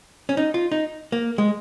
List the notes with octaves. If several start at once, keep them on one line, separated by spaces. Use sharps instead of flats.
C#4
D#4
F4
D#4
A#3
G#3